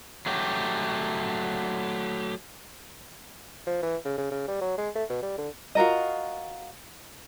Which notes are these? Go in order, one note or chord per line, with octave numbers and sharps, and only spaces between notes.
F#3 A3 G4
F3
E3
C#3
C#3
C#3
G3
F#3
G#3
A3
B2
G3
D3
F4 F#4 A#4 D#5